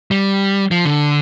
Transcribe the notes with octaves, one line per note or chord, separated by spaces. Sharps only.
G3
F3
D3